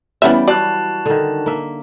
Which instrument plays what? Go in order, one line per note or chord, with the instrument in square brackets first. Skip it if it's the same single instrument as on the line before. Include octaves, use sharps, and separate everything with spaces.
[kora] E3 G3 G5 [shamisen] B3 C#4 E5
[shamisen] F#3 D5 [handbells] F#4 A5 F#6
[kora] D3 D#3
A#3 E5